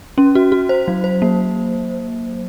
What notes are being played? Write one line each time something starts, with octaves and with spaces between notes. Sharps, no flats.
C#4
F#4
F#4
C5
F#3
C5
A#3